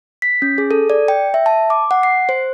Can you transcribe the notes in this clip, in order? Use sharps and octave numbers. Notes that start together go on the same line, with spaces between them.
B6
C#4
G#4
A4
D5
G5
E5
A5
D6
F#5
C7
C5